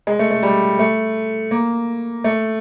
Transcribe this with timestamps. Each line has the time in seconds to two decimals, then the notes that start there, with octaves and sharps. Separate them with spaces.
0.07 G#3
0.19 A3
0.31 A3
0.43 G3
0.79 A3
1.51 A#3
2.24 A3